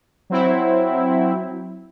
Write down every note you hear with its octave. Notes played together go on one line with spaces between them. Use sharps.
F#3 C4 E4